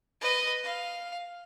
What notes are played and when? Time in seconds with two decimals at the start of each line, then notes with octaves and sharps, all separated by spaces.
0.21 B4 D#5
0.64 F5